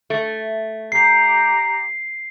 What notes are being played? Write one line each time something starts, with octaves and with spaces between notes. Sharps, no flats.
A3
G4 A#5 C7